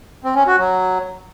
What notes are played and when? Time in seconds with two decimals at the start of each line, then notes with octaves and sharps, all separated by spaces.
0.24 C4
0.35 C#4
0.47 F#4
0.58 F#3